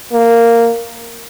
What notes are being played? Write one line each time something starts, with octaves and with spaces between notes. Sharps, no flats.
A#3